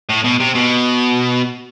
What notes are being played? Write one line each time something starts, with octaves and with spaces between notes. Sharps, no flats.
A2
B2
C3
B2